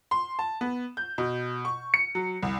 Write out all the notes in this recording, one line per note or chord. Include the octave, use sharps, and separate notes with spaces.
C6
A5
B3
G6
B2
C#6
C#7
F#3
C2